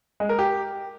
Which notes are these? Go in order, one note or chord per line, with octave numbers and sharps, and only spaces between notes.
G#3
A#4
G4